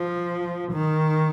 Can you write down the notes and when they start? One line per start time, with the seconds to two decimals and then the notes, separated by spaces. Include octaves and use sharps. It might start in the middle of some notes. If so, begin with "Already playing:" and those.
Already playing: F3
0.72 D#3